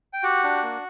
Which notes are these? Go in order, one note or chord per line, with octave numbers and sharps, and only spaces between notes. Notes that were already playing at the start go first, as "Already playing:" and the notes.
G5
F#4 G4 F#5
D4
A#3